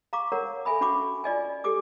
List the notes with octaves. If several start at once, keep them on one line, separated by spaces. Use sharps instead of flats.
F5 A#5 C#6 D6
A#4 C#5 F#5 A#5
A4 E5 G#5 B5 D#6
C#4 D4 F#4 B5 C#6 D6
F4 D5 D#5 G#5
G4 A4 D6 D#6